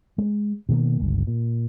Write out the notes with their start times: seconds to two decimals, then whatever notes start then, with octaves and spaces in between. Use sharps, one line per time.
0.18 G#3
0.69 B2 D#3 F3 A#3
1.00 G1 C#2 G2
1.27 A#2